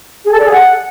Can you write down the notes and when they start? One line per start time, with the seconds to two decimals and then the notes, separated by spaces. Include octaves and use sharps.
0.25 G#4
0.32 A4
0.38 D5
0.45 G#4
0.52 F#5